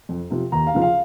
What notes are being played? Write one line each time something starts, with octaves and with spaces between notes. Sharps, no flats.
F2
C3 F3
D#2 A#5
F5
C#3 F3
F5